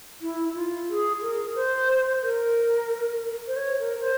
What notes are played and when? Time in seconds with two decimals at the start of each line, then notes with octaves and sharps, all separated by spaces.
0.21 E4
0.55 F4
0.89 G#4
1.22 A#4
1.55 C5
2.23 A#4
3.48 C5
3.57 C#5
3.79 A#4
4.01 C5